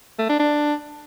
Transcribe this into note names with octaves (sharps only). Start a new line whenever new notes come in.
A3
D4
D4